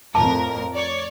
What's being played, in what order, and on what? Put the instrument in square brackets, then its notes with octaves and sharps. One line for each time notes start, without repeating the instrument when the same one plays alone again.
[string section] F2 A2 A#4 [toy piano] A5
[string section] C#5 D5